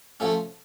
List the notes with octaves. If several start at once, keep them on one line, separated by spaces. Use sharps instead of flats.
F3 A3 C#4